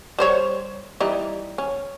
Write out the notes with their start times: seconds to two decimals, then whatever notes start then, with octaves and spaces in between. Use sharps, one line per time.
0.19 G3 C5 C#5
1.00 E3 G3 D#4
1.58 C#4